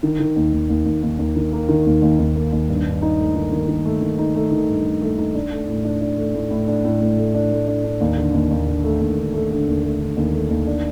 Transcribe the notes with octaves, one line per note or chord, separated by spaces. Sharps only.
D#3
D#3
D#2
D#2
D#2
D#2
D#2
D#2
D#3
A#3
D#3
D#2
D#2
D#2
A#3
D#2
G2
G2
D#4
A3
D#3
D#3
D#3
A3
D#3
D#4
A3
D#3
G2
A3
A3
D#4
D4
A3
A2
D4
D4
A3
A2
A2
D4
A2
A2
A3
D4
A3
D4
D4
D#2
D3
D#2
D#2
D3
A3
D#2
D3
A3
D3
D#2
A3
D3
D#2
A3
D#2
D4